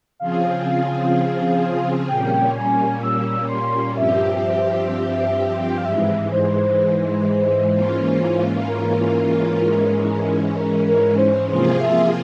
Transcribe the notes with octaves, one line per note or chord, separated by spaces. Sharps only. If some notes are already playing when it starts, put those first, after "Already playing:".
C#3 F3 C4 F4 G#4 F5
A#2 G3 A#3 C#4 G5
G#5
E6
C6
G2 F3 C4 G4 E5
G5
F5
G#2 E3 G#3 E5
C5
G#2 E3 A#3 C#4 F4
A#4
G#2 E3 G#3 C#4
A#4
A#4
C5
C3 F3 A#3 F4 G#4 C5
E5